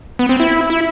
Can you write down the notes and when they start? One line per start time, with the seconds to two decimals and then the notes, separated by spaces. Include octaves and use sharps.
0.19 B3
0.29 C4
0.40 E4
0.70 E4